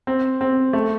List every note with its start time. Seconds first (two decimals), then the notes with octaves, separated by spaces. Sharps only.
0.07 C4
0.41 C4
0.73 A3